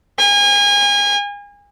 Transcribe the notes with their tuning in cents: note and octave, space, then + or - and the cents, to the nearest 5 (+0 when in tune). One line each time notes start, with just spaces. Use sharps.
G#5 -35